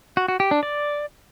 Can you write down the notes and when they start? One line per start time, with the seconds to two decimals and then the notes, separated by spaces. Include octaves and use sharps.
0.17 F#4
0.28 F#4
0.40 G4
0.51 D4
0.63 D5